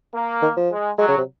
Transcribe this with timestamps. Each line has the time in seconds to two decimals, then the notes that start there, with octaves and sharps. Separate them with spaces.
0.14 A#3
0.42 D#3
0.57 F3
0.70 G#3
0.98 F#3 G#3
1.08 C#3
1.18 C3